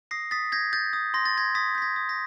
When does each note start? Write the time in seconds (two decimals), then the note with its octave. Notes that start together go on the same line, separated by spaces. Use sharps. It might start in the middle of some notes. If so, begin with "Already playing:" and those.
0.11 D#6 A#6 C7
0.31 D#6 A6 B6
0.52 G6 G#6 A#6
0.73 G6 A6
0.93 D#6
1.14 C6 A#6
1.25 A6
1.34 C6 G#6 A#6
1.55 D#6 A6 B6
1.75 G6 B6
1.82 G#6 A#6
1.96 D#6
2.09 G#6 A#6